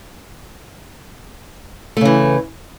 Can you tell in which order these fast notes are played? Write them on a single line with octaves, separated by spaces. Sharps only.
A3 C#3 E3